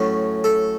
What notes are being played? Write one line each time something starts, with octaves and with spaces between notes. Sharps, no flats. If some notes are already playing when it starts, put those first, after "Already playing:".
Already playing: A2 F#3 A3 C#4
A4